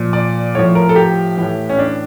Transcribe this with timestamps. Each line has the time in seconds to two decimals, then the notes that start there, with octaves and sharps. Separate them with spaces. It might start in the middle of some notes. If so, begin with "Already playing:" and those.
Already playing: A#2 F3
0.13 D5
0.55 A2 F3 C#5
0.75 A#4
0.89 A4
0.96 G4
1.38 A2 E3
1.69 C#4
1.79 D4